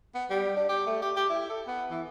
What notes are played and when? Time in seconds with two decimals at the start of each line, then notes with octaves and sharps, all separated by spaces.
0.15 B3
0.30 G3
0.56 D4
0.69 G4
0.87 A3
1.02 G4
1.16 G4
1.29 E4
1.50 A4
1.68 B3
1.91 E3